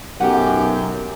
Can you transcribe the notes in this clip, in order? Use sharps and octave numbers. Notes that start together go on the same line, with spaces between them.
B1 F#2 G4 F#5